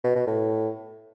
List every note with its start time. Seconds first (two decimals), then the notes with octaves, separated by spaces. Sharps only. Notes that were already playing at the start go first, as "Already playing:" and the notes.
0.04 B2
0.16 B2
0.27 A2